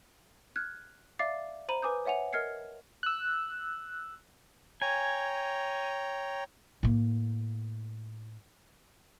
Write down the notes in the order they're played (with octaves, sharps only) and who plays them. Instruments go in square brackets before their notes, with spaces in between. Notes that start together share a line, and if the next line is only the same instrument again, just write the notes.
[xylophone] F6 F#6 G#6
D5 E5 F5 D6 A6 C7
C5 A#5 B5 D#7 F#7
B4 G#5 D6 D#6 G6
C#5 E5 F#5 G#5 F7
A#4 D#5 F6 G#6 C7 C#7
[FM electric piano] E6 F#6
[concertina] C#5 G5 A#5 [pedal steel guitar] G#5
[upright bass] A2 A#3